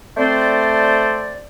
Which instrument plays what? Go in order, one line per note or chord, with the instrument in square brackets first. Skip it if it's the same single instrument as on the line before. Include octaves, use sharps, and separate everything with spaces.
[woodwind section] A3 C4 C5 D5